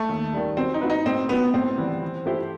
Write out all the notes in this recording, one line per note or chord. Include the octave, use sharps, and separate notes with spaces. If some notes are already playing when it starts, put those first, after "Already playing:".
Already playing: A3
D#2
D#3 G3
F#3 C4
D#4
C4 F#4 B4
D#4
A2 C4
F#3 B3 C4 D#4
A2 C4
E3 G3 B3
E3
A3 E4 G4 C5